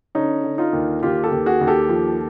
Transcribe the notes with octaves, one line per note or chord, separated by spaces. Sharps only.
D3 C#4 D#4
D3
D#4 F4
D#2
D#2 F4 G4
G4 A4
D#2
F#4 G#4
D#2
G4 A4
F3